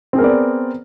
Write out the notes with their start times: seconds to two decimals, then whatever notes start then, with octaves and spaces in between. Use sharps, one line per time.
0.13 C4
0.16 G#4
0.19 A#4
0.21 B3
0.24 D5